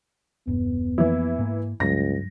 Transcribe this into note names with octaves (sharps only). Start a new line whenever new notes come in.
E1 G2 B3
F2 E3 F3 A#3 E4
G#2 A#3
C#2 G2 F#3 A#6